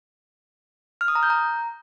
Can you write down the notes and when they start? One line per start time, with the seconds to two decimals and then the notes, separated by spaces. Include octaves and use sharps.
1.01 F6
1.08 D#6
1.15 A#5
1.23 G6
1.30 A#5